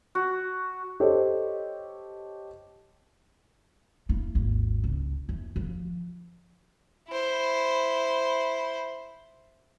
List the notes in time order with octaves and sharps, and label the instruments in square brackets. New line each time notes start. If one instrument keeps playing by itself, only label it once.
[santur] F#4
[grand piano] G4 A4 C5 C#5 D#5
[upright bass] A#3 E4
G#1 D#2
C#2
E2
F3
[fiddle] E4 C5